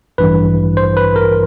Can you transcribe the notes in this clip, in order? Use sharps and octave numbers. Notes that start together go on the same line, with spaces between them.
A1 G2 E3 B4
C5
B4
A#4